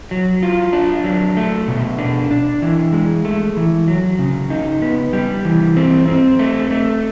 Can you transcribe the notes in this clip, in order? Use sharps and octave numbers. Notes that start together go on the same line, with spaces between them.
F#3
F4
D4
F#3
A3
B2
D4
D4
E3
G#3
A3
E3
F#3
C#3
D#4
B3
G3
E3
C4
C4
A3
A3